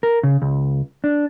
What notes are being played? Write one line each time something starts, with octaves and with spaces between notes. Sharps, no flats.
A#4
C#3
C#2
D4